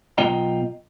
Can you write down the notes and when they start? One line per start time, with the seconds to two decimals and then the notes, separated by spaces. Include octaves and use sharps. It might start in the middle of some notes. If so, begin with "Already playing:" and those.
0.18 B1 B3 F4 D#5 G5 A#5